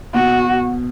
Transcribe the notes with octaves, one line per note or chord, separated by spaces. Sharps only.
B2 F#4